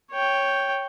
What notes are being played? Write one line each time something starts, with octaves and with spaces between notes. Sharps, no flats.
C#5 G5